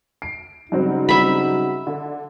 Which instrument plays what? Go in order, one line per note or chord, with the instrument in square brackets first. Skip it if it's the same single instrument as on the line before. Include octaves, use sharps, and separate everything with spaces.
[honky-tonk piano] C7 D7
[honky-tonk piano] G2 F#3 C4 [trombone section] C#3 D#4 F#4
[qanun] E5 B5
[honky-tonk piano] D3